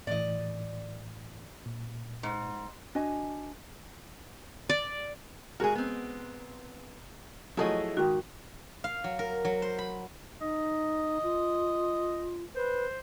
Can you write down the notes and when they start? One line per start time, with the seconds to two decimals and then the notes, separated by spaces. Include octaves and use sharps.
0.07 A2 E3 D5 D#5
1.66 A#2
2.23 G#2
2.95 D4 F#4 D#5 G#5
4.70 D5
5.60 G#3 F#4 G#4 A#4
5.76 B3 C4
7.57 F3 F#3 A3 E4 G#4 D#5
7.97 G#2 D#3 F#4 G5
8.84 F5
9.04 F#3
9.19 A#4
9.45 F#3
9.62 C5
9.78 B5
10.41 D#4 D#5
11.23 F4
12.56 B4 C5